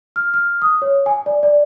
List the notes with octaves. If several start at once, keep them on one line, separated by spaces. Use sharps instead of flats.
F6
F6
D#6
C#5
G#5
D5
D5